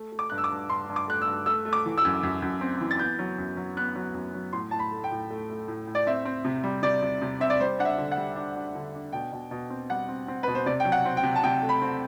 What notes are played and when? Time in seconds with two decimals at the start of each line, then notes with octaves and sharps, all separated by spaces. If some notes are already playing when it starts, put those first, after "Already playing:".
Already playing: A3
0.12 A3
0.19 D6
0.30 G2 F#6
0.38 E6
0.44 D6
0.51 G2
0.70 G2 C6
0.89 G2
0.96 D6
1.08 A3 F#6
1.22 E6
1.27 G2
1.46 A3 E6
1.65 A3
1.73 D6
1.86 E3
1.98 E6
2.05 F#2
2.23 F#2
2.42 F#2
2.61 C4
2.81 E3
2.91 A6
2.99 B3 G6
3.19 F#3
3.38 F#2
3.57 F#3
3.77 B3 F#6
3.95 F#3
4.14 F#2
4.34 F#3
4.53 A2 C6
4.71 A2 A5
4.79 B5
4.92 A3
5.04 G5
5.11 A2
5.30 A3
5.50 A3
5.68 A2
5.87 A2
5.95 D5
6.07 C4 E5
6.25 C4
6.45 C3
6.63 G3
6.83 C3 D5
7.02 C3
7.22 C3
7.40 C4 E5
7.50 D5
7.60 G3 C5
7.79 D4 F#5
7.85 E5
7.98 D3
8.12 F#5
8.17 G3
8.36 D4
8.55 D4
8.75 D3
8.95 D4
9.12 B2 G5
9.32 B2
9.51 B2
9.70 C4
9.90 G3 F#5
10.08 C4
10.28 C4
10.43 B2 B4
10.55 C5
10.66 C3 D5
10.80 G5
10.85 F#3
10.92 F#5
11.05 C4
11.17 G5
11.23 C3
11.36 A5
11.43 C3 G5
11.63 A3
11.69 B5
11.82 C4